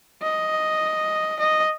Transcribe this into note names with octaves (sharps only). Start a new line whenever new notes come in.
D#5
D#5